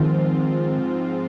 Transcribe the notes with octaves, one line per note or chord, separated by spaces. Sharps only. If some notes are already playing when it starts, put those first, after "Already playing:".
Already playing: G#2 D#3 F3 C4 F4